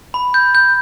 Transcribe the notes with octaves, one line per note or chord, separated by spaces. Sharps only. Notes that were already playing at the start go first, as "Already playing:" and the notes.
B5
G6
G6